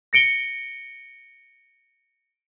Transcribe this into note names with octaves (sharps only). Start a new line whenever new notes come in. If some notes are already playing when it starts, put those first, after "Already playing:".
A#6 C#7 D7 G7